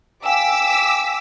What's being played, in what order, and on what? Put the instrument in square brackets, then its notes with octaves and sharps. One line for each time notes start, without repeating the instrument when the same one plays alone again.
[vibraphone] F5 G5 G#5 [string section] D6 E6 B6